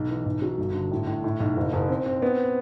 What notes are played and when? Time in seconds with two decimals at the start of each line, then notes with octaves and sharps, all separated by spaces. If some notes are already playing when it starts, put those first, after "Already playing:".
Already playing: B1
0.10 E3
0.26 B1
0.42 F#3
0.58 G1
0.74 D3
0.91 A2
1.07 A2
1.24 A2
1.40 B1
1.56 F#1
1.73 F#1
1.89 C4
2.06 C4
2.22 B3